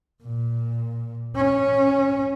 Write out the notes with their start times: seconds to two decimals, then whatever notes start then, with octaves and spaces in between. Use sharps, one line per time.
0.24 A#2
1.36 C#4